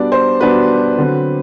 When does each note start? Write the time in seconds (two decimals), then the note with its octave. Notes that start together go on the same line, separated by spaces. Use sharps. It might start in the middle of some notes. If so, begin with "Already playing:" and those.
Already playing: B2 G3 B3 D4 D5
0.12 C5
0.40 B2 G3 B3 D4 B4
0.98 D3 F#3 C4